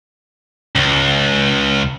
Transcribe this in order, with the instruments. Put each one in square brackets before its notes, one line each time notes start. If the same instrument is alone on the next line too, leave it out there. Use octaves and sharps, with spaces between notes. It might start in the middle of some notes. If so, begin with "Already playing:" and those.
[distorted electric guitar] C#2